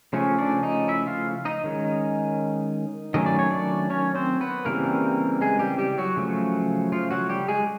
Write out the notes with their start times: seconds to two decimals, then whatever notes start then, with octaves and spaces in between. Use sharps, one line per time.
0.13 C#3 F3 A3 C#4
0.38 D4 D5
0.63 D#4 D#5
0.88 E4 E5
1.07 F4 F5
1.45 D#4 D#5
1.64 D#3 G#3 C#4
3.14 D#3 F#3 A3 C#4 D#5
3.26 D5
3.39 C#5
3.50 D4 D5
3.90 C#4 C#5
4.15 C4 C5
4.41 B3 B4
4.65 C#3 E3 G3 A#3 C4 A#4
5.41 G#3 G#4
5.59 G3 G4
5.78 G3 G4
5.98 F#3 F#4
6.17 C#3 F3 A3
6.92 F3 F4
7.11 F#3 F#4
7.30 G3 G4
7.48 G#3 G#4